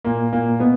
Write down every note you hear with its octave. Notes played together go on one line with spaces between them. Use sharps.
A#2 A#3
A#2 A#3
B2 B3